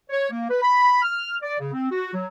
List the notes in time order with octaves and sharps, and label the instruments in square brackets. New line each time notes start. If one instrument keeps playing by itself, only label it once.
[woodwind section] C#5
A#3
B4
B5
F6
D5
C#3
C4
F#4
F#3